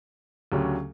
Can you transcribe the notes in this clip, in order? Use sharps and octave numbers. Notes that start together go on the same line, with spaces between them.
D2 C#3 F#3 C#4 G4